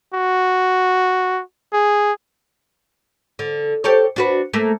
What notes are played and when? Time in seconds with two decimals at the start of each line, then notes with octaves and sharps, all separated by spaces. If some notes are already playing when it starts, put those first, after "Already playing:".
0.14 F#4
1.73 G#4
3.39 D3
3.84 G4 A4 C#5
4.16 D4 F#4 B4
4.53 A3 A#3